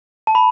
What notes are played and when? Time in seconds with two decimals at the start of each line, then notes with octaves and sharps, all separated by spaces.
0.27 A5
0.35 B5